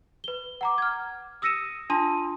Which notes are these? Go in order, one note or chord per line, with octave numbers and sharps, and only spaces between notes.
B4 G7
F#5 A#5 D6
F6 G#6
D#6 E6 A#6 C#7 D#7 E7
D4 F4 A5 C6 D#6 D#7